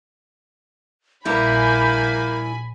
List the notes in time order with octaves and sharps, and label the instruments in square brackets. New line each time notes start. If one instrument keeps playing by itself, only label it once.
[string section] A#1 G#5 B5 [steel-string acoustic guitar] G3 E4 [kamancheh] A#3 [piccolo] G6